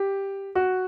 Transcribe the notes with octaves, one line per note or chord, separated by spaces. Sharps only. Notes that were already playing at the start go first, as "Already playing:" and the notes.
Already playing: G4
F#4